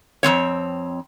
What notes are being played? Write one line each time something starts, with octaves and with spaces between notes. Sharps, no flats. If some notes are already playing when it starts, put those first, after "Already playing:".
F2 F3 C4 C#5